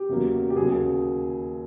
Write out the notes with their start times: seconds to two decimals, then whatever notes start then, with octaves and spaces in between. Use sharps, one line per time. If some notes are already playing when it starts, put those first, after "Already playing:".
Already playing: G4
0.09 E2 C#3 F#3 A#3
0.50 G4
0.56 D#2 C#3 F#3 G#4
0.72 G#4